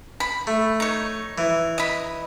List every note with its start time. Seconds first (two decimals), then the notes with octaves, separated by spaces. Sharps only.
0.20 B5
0.47 A3
0.80 D#4 C#5
1.38 E3
1.78 D#5 B5